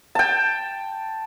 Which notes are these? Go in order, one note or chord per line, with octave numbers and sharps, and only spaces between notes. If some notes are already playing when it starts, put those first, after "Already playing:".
G5 A5